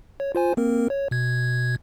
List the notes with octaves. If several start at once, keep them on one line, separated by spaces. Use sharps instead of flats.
C#5
F4 C5 G#5
A#3 C4 A#4
C#5
B2 G#6